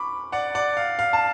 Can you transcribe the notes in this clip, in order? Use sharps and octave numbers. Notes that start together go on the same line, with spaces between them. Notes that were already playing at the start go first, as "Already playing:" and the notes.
Already playing: B5 C#6 D6
D5 F#5
D5 F#5
F5
F5
A5